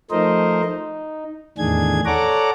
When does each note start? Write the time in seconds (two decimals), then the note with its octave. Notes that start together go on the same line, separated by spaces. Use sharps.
0.11 F3 A3 D#4 A#4 C5 D#5
0.64 D#4
1.58 E2 A2 D#3 D4 G#4 G#6
2.06 A4 C#5 D5 F#5 A#5 D6